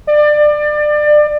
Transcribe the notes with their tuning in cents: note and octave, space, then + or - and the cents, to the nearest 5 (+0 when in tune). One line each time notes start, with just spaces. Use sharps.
D5 +25